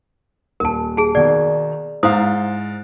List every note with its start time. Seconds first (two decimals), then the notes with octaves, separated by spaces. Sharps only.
0.60 D#1 A#4 A5
0.97 G#4 A5
1.15 B2 D#3 D5
2.03 G#2 E4 C5 F5 D#6